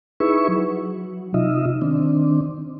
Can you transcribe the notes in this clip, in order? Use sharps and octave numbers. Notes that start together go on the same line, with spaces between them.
D#4 E4 G#4 B4 E5 C#6
F#3
C3 D#4 F4 D#5 E5
D#3 C4 D4